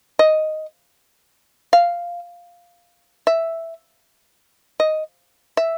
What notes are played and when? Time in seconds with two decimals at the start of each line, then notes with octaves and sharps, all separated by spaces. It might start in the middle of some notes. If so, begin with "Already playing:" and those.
0.19 D#5
1.73 F5
3.27 E5
4.80 D#5
5.57 E5